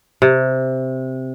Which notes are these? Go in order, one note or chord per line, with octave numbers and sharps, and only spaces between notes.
C3